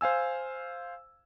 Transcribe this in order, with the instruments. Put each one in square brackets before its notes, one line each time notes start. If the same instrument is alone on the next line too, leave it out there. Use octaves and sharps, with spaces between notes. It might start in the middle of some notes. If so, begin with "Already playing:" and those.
[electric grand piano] C5 F5 G#5 E6